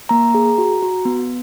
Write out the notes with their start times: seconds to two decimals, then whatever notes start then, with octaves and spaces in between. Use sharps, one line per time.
0.09 A#3 A#5
0.35 G#4
0.58 F#4
0.83 F#4
1.05 B3